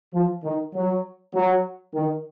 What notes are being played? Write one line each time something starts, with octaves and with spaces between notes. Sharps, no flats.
F3
D#3
F#3
F#3
D#3